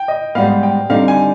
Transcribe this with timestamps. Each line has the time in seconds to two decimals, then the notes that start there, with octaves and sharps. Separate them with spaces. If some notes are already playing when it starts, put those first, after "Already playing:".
Already playing: G5
0.08 D#5
0.35 G#2 G3 B3 F5
0.63 G5
0.90 D3 G3 C4 D#4 F5
1.08 G#5